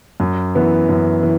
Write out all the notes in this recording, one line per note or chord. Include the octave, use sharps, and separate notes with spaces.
F#2
E3 B3
F#2
E3